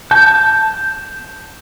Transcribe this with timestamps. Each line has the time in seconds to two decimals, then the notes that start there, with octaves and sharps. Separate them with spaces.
0.11 A5 G6